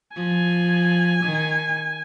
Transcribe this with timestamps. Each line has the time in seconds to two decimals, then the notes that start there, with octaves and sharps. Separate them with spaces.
0.16 F3 G#5
1.24 D#3